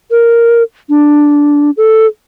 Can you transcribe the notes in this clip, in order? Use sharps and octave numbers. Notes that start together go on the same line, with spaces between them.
A#4
D4
A4